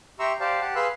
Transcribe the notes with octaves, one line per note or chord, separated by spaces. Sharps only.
G4 E5 A#5 C6 C#6 E6
G4 C5 D5 F5 A5
G4 F#5 A5
G#4 B4 F5 C6 E6 F#6